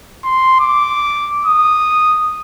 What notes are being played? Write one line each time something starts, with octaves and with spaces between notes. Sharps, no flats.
C6
D6
D#6